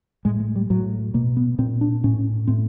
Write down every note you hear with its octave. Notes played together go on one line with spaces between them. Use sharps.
A2 G#3
G#3
G3
A2 F#3
B2 A#3
B3
A#2 C4
D4
A2 C#4
A2 C4